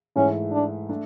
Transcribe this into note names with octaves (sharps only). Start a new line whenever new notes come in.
G#2 E3 A3 C#4 E4
D4
A3 D4